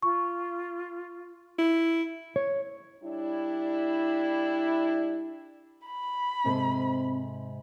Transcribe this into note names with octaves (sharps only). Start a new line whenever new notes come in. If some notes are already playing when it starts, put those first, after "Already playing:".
F4 C#6
E4
C#5
G3 D4 E4
B5
G#2 C3 C4 A4